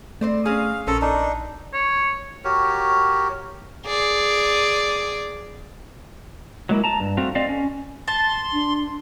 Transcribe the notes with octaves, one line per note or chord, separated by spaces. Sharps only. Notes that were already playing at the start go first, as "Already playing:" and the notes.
A3 C4 C5 D5
C4 C#4 G#4 F5
A#1 C#4 A4 A#4 C5
D4 D#4
C#5
F#4 G4 A#4 C#5
G#4 D5
F#3 G#3 A#3 E4
A5 A#5
G2
A3 C4 F#4 F5
A3 C4 D5 D#5 F5
C#4
A5 C6
D4